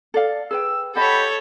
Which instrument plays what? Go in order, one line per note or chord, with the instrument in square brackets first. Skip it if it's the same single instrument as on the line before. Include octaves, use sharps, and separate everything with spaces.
[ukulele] A4 D5 F5
[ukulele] G#4 B4 G5 [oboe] E6
[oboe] G4 [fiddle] A4 C#5 [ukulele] D#5 F#5 [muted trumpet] B5